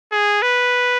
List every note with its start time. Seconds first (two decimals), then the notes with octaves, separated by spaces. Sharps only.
0.12 G#4
0.42 B4